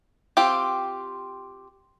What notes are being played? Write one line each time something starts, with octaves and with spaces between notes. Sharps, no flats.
C4 F4 G4